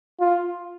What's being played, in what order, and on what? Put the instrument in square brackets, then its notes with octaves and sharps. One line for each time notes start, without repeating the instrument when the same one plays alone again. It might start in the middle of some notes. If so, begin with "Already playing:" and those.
[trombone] F4